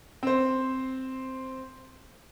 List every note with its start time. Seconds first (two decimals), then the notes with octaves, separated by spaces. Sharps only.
0.23 C4 C5